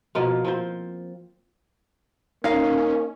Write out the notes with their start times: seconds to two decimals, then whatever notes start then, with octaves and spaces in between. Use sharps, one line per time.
0.15 B2 F3 A#3 F4
0.45 F3 C4 C5
2.44 A#3 C#4 D#4 F5